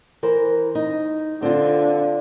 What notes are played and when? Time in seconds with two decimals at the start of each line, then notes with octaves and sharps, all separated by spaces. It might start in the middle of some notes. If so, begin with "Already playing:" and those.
0.23 E3 A#4 C5
0.75 D#4
1.42 D3 C4 F4